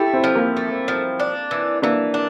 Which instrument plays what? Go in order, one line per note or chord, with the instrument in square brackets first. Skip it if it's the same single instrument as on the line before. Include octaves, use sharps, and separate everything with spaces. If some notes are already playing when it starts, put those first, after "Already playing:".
Already playing: [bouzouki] A3 [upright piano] E4 G4
[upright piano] C4 E4
[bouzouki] F3
[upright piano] A#3
[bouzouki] A3
F3
D4
E3
[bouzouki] E3 [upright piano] A#3 D4
[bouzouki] D4